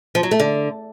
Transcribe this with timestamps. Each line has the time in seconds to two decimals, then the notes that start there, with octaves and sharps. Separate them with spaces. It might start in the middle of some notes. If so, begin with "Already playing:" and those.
0.15 F3
0.23 F#3
0.31 A3
0.40 D3